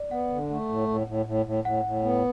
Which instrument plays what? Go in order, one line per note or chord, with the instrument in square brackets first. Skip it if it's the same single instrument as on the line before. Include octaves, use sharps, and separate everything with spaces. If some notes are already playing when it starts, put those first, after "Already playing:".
Already playing: [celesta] D5
[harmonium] B3 [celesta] F#5
[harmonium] D3
A3
A2
A2
A2
A2
A2
[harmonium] A2 [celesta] F#5
[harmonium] A2
B3